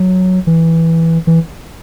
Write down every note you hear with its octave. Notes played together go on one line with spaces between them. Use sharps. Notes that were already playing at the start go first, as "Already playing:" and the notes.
Already playing: F#3
E3
E3